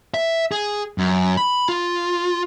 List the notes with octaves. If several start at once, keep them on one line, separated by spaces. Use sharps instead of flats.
E5
G#4
F#2
B5
F4